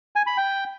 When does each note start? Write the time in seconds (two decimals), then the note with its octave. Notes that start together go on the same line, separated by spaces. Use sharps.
0.16 G#5
0.27 B5
0.38 G5